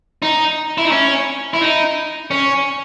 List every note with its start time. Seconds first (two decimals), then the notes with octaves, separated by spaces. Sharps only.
0.22 D#4
0.78 E4
0.85 D#4
0.92 C#4
1.54 E4
1.61 D#4
2.31 C#4